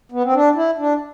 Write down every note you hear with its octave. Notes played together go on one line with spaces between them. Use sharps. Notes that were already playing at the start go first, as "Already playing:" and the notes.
B3
C4
D4
E4
D4